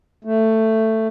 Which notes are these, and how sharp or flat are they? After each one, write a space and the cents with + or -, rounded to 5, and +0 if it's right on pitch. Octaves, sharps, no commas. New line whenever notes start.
A3 +10